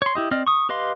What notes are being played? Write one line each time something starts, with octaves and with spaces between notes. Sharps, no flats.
C#5 C6
E4 G4 D#5
C4 D5 D#5 F6
C#6 D#6
G4 B4 D#5 F5 C6